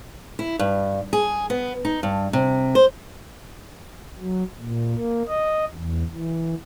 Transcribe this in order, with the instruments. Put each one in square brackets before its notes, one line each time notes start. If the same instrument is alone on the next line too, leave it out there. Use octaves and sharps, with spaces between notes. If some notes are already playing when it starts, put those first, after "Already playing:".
[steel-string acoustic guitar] E4
G2
G#4
B3
D#4
G2
C3
C5
[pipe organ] F#3
A#2
A#3
D#5
E2
E3